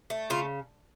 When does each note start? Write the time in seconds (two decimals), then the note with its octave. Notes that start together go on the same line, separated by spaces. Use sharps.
0.10 A3
0.30 C#3 F4